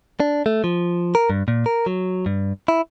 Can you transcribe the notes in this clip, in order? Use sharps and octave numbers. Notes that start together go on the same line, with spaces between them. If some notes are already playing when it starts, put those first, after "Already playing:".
D4
A3
F3
A#4
G2
A#2
A#4
F#3
G2
E4